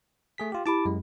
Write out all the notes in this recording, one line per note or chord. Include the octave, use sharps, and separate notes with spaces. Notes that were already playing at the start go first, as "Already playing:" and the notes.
A3 G#4 B6
F4 G4
E4 G4 A5 B5 D6
F#2 G#3